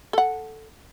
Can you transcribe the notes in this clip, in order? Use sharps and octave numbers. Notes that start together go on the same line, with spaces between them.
A4 F#5